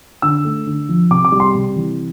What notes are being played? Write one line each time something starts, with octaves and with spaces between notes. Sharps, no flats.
D3 E6
A3
D3
F3
C3 D6
D6
G3
C6
C3
E3